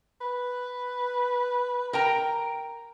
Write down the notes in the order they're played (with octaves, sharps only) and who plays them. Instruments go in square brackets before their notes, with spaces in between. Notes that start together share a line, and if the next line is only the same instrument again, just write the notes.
[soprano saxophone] B4
[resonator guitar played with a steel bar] A#4 G5 A#5